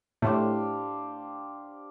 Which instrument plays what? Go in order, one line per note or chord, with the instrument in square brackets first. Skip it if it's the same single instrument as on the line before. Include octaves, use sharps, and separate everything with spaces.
[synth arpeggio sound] A2 A3 [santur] D4 G4 C5 F5